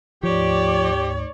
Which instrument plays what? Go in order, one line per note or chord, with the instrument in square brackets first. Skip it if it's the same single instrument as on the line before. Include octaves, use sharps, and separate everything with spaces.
[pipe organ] D2 G#2 [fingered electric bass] F3 [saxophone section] G4 [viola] C#5 D5